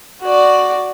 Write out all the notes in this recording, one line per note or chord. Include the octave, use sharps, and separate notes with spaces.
F#4 D5